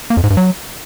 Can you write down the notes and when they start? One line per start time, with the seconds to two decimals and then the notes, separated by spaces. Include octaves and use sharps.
0.10 A#3
0.17 F2
0.24 G#2
0.30 G2
0.37 F#3